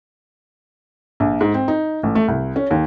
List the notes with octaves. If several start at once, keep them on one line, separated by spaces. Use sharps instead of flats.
A#1
G#2
C4
D#4
A1
A3
C2
C#4
D#2